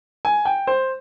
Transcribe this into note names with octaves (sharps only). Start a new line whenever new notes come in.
G#5
G5
C5